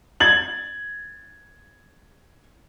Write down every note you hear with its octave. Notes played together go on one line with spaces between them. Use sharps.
G#6 A6 F#7